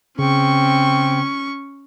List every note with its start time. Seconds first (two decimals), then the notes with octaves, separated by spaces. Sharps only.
0.19 C#3 C4 C#4 C#6